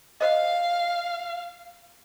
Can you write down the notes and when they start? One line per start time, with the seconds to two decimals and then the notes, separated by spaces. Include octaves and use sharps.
0.21 C5 D#5 F5